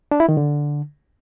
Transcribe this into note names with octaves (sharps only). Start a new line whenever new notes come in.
D4
E4
D#3
D3